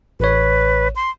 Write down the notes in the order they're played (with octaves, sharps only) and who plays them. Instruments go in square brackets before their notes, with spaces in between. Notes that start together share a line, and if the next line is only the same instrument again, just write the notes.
[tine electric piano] A1 C#5 [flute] B4
[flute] C6